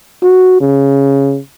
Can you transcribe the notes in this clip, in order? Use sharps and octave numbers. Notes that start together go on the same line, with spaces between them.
F#4
C#3